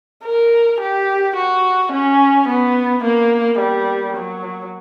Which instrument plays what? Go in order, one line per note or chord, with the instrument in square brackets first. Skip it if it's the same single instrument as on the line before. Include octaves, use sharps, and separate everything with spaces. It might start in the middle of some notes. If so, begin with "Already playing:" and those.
[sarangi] A#4
G4
F#4
C#4
B3
A#3
G3
F#3